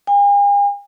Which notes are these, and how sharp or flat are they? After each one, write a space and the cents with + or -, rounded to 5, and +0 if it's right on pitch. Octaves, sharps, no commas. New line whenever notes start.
G#5 -45